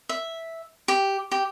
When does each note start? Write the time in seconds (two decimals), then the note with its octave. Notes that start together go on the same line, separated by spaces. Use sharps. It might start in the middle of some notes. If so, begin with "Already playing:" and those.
0.09 E5
0.88 G4
1.32 G4